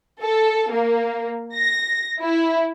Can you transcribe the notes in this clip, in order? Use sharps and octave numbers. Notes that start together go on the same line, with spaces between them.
A4
A#3
A#6
E4